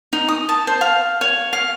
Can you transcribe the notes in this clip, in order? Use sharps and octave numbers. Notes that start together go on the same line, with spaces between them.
D#4
D#6
A5
C5
F5
C#5
F5